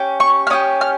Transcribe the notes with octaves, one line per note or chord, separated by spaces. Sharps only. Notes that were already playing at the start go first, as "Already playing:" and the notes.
Already playing: C#4 G4
C#6
F6
C#4 G4 D#6
F6